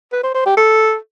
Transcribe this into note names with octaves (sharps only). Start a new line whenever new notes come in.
B4
C5
C5
G4
A4